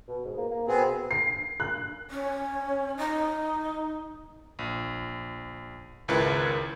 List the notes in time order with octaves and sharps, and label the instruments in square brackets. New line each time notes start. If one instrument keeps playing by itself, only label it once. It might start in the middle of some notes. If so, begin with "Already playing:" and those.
[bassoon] B2
G#2
A#3
A#3
[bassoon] B2 [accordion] B3 C4 G#4
[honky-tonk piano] C7
F#6
[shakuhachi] C#4
D#4
[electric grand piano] A#1
G#1 C#2 E4 A#4 B4